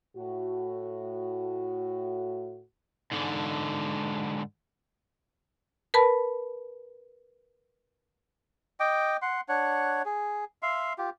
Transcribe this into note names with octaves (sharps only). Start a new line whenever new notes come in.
A2 F#4
G#2 D3
A#4 B4 A5 B5
D#5 G5 D6
F#5 C6
D4 C#5 F#5
G#4
E5 F5 C6
F4 G4